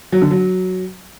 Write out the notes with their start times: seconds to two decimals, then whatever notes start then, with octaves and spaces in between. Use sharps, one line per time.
0.12 F#3
0.22 D3
0.31 F#3